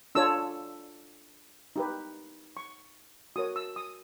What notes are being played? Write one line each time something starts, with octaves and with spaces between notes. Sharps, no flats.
D4 F4 A4 C#5 E6
D#4 G4 B4
C#6
F#4 A#4 C#5 D#6
E6
D#6